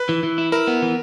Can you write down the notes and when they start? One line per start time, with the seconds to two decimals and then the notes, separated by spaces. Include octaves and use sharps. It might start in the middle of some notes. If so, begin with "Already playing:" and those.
Already playing: B4
0.09 E3
0.23 E3
0.38 E4
0.52 E4 A#4
0.67 B3
0.82 E3